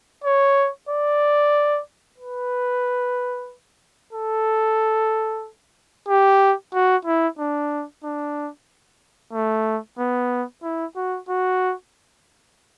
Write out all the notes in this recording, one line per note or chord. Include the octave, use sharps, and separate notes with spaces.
C#5
D5
B4
A4
G4
F#4
E4
D4
D4
A3
B3
E4
F#4
F#4